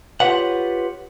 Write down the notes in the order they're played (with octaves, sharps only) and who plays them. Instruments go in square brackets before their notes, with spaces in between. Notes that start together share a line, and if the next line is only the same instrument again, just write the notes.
[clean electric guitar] F4 G4 G#4 B4 C#5 F#5